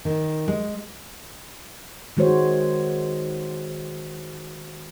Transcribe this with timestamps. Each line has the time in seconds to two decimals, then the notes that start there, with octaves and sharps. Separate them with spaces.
0.05 D#3
0.48 G#3
2.17 D#3 G#3 F#4 C5 C#5